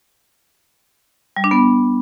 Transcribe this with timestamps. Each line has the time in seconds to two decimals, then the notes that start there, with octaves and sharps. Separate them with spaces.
1.36 G3
1.44 D4
1.51 B3